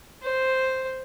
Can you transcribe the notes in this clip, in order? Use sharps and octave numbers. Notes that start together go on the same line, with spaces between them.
C5